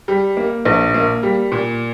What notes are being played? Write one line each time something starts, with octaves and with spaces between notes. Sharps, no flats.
G3
A#3
A#1
A#3
G3
A#2